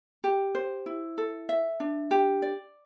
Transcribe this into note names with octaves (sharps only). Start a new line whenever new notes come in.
G4
C5
E4
A4
E5
D4
G4
D5